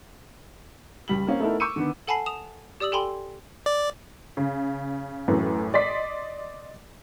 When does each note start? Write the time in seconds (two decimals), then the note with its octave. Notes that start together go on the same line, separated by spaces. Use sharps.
1.08 C#2 G3 F#7
1.27 A#3 C4 C#4 F5
1.40 A3 B3 D#4 E4 A4 A#4
1.60 C#6 D6 E6 G6 C#7 D#7
1.76 D3 D#3 B3
2.08 A4 F#5 G#5 A5 B5 C7
2.26 D#6 E7 F7
2.80 G4 D5 D#6 E6 F#7
2.92 G4 A4 G5 G#5 B5 C6
3.66 D5
4.37 C#3
5.28 F#2 A2 E3
5.74 D5 D#5 C6 B6